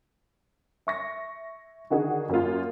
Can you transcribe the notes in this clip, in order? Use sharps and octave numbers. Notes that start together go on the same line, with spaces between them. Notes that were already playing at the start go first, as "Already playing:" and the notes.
E5 C#6 A#6
D3 D#3 F#4 G#4
F#2 A#3 F4